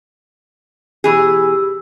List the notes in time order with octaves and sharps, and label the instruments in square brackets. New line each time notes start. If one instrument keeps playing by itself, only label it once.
[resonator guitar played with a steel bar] B2 E3 G#4 [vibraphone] G4 E6